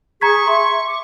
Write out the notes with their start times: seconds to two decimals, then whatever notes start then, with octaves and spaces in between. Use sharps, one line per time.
0.21 G#4 A#5 C#6 G#6 B6
0.47 E5 C6
0.87 D6